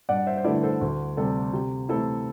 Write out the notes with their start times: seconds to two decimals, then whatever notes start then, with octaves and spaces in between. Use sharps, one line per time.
0.09 G2 D5 F#5
0.27 C5 E5
0.37 C5
0.44 D3 A3 E4 B4 D5
0.63 A4 C5
0.81 D2
1.17 C3 G3 A4
1.53 C3 G4
1.89 E3 A3 C4 E4 A4